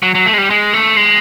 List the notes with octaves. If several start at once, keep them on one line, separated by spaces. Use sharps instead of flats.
F#3
F#3
A3
G#3
G3
G#3
A3
G#3